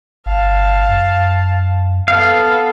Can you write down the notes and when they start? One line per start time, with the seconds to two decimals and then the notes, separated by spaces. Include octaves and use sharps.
0.26 G1 F5 A5
0.89 F#2
2.08 B3 A4 F5